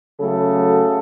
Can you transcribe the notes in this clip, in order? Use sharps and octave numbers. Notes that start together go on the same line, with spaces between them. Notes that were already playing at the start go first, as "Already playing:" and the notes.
C#3 F#3 A3 A4